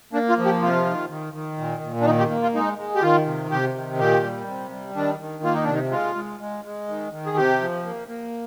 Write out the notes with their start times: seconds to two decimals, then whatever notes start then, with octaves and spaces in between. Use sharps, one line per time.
0.13 A#3 D4
0.29 F4
0.38 F3
0.45 G4
0.62 C3 F4
0.85 D#3
1.09 D#3
1.33 D#3
1.58 A#2
1.82 A#2
2.01 D4
2.06 D#3 D#4
2.19 G4
2.30 A#3
2.43 F4
2.55 G#3 D#4
2.78 G#3
2.96 G4
3.02 D#3 F4
3.26 C3
3.51 C3 G4
3.75 D#3
3.99 A#2 G4
4.23 G3
4.47 C3
4.71 G3
4.95 D#3 D4
5.20 D#3
5.43 A#3 F4
5.54 D#4
5.64 C3 D4
5.74 D#4
5.92 G#3 F4
6.15 G#3
6.40 G#3
6.65 G#3
6.89 D#3
7.12 D#3
7.26 G#4
7.37 C3 G4
7.61 F3
7.85 A#3
8.08 A#3